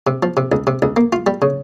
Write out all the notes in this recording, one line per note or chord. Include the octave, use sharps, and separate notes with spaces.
C3
F3
C3
C#2
C3
C#2
A#3
F4
G3
C#3